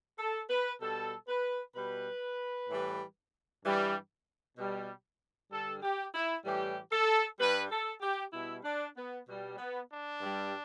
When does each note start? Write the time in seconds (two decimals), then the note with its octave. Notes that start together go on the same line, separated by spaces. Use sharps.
0.19 A4
0.50 B4
0.81 B2 G3 A4
1.28 B4
1.75 B2 G3 B4
2.69 A2 E3 G3
3.64 G2 E3 G3
4.57 B2 G3
5.51 G2 D3 G3 A4
5.83 G4
6.14 E4
6.45 A2 E3 G3 G4
6.92 A4
7.39 G2 G3 B4
7.71 A4
8.01 G4
8.33 B2 G3 E4
8.64 D4
8.97 B3
9.27 B2 G3
9.58 B3
9.91 D4
10.21 G2 G3